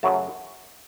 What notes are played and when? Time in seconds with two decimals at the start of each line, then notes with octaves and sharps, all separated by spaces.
0.03 F#2 C#3 F#3 A3 A5